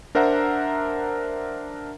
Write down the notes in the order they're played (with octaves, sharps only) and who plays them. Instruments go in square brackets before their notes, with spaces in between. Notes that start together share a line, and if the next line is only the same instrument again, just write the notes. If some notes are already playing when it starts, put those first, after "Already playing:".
[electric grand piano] D4 A#4 C5 E5 F#5 A#5